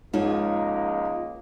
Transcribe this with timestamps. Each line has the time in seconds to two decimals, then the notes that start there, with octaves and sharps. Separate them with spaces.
0.14 C#2 G#2 F3 A#3 D#4 F4 C#5